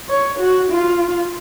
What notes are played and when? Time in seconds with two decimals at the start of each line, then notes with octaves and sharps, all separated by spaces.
0.09 C#5
0.39 F#4
0.71 F4